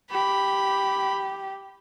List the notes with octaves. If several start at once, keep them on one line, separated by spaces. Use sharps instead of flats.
G4 B5